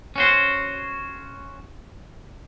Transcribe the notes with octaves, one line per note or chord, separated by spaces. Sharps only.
C#4 F#4 C5